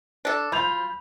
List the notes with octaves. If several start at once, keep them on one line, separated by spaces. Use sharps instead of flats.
D4 A4
F4 B5 G6 F7